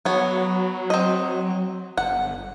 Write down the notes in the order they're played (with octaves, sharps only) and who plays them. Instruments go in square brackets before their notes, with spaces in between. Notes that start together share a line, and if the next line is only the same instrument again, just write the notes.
[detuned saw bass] F#3 [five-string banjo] B3 C#5
[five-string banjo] C4 D#5
[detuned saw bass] G1 [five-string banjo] F#5